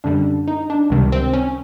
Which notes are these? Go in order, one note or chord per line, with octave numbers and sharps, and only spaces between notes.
F#2 D3 G3 D4
D#4
D4
C#2 C3 D#3 G3
C4
C#4